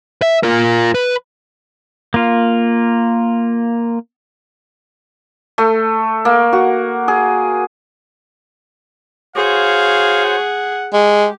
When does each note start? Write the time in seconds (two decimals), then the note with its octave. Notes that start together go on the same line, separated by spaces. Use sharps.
0.22 E5
0.43 F4 A#4
0.95 B4
2.14 A#3 F4
5.58 A3
6.25 A#3
6.53 F#4
7.08 G#4
9.36 F#4 G#4 C5 C#5 F5
10.25 F#5
10.93 G#3 G4